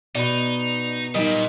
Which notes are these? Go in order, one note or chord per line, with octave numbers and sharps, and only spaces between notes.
B2 D#4 D5 B5
A#2 G3 D#4 A#4 D#5